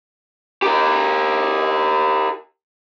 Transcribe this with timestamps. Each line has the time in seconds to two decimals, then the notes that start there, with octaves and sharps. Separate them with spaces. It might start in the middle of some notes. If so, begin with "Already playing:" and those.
0.62 G4 A#4